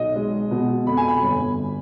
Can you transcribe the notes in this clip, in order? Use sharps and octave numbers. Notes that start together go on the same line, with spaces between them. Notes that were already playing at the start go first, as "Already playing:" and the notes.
Already playing: B1 D#5
G#3
B2
F2 B5
G#5
B5
G1